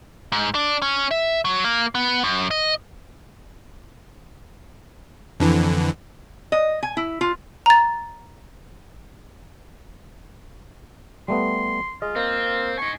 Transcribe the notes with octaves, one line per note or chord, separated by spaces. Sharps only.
G#2
D4
C#4
E5
F#3
A#3
B3
F#2
D#5
F2 D3 E3
D#5
G#5
E4
F4
A#5 A6
G3 A3 B3 C6
G#3 F4 D#5
A#3 C4
D#4 G#5 C#6